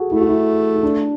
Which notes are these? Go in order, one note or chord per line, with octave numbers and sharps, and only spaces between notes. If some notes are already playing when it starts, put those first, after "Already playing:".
Already playing: F#4 G#4 A4
A3 E4
F#4
E4
E4
D4